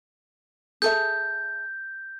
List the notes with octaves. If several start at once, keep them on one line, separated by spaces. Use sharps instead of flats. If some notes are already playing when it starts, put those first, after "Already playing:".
G#4 A4 E5 G6